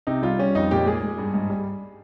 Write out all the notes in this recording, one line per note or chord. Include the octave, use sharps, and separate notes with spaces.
C3 D#4
G3 F4
G3 C#4
F2 D#4
A#2 G4
G#3 G#4
G#3
G2
G#2
G3